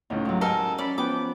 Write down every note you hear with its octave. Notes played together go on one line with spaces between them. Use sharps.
C#2 A2 C#4 D#4
G#2 F#3
G4 A4 A#4 D#5 G#5 F6 G7
C#4 D5 B5
F3 B3 B4 G5 D6